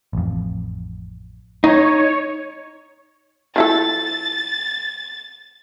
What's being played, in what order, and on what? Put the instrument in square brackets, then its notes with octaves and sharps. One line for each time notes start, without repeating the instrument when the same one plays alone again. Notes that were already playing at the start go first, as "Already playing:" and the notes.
[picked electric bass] A1 F2
[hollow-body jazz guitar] D#4 [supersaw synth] C#5
[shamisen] F3 E4 A4 [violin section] A6